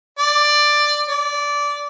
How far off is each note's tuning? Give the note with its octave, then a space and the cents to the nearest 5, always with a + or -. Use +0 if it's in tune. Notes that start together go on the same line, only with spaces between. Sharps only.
D5 +10
D5 -15